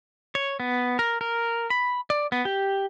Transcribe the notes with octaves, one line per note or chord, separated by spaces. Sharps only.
C#5
B3
A#4
A#4
B5
D5
B3
G4